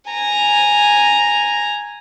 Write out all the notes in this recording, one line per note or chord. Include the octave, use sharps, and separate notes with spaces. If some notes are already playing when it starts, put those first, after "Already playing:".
G#5 A#5